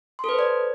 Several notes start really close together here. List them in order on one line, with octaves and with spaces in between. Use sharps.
C6 A4 B4 C5 D5